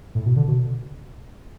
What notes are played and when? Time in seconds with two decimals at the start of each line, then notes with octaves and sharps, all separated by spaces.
0.15 A2
0.25 B2
0.36 D3
0.48 B2